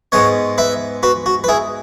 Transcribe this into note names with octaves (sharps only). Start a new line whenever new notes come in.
G#2 G#3 B3 C#5 F#5
B4 E5
F#4 B4
F#4
B4
E4 G#4